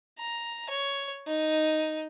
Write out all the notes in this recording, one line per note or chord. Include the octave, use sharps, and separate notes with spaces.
A#5
C#5
D#4